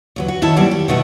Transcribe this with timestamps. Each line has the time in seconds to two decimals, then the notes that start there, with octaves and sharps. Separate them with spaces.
0.16 D2 F#3 B4
0.28 F#4
0.42 D#3 E4 C#5 A5
0.56 A#2 F#3 G3 B3 C4
0.71 G4
0.88 B2 D#3 A3 F#4 B4